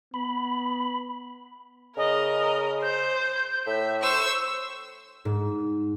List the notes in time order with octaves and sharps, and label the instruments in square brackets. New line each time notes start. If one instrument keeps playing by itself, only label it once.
[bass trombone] B3 [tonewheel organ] B5
[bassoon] C#3 [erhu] A#4 [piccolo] D#5
[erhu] C5 [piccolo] G6
[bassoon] A2 [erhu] E5
[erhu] C5 [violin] C#6 E6
[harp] G#2